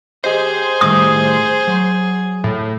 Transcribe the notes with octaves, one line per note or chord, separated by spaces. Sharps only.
G4 G#4 C5 D#5
A2 D#3 G3 D#6
F#3
A2